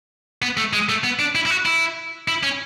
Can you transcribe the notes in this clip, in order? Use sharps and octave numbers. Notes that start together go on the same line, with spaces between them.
B3
A3
G#3
A3
B3
D4
E4
E4
F#4
E4
E4
C#4